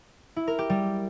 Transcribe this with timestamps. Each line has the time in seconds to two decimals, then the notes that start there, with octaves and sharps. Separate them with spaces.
0.36 E4
0.47 A#4
0.59 G4
0.70 G3